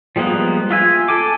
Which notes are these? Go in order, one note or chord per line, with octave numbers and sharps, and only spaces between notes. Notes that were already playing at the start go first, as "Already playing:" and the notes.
F3 G3 G#3 A#3 B3
F4 E5 G#5
A4 G#5 D6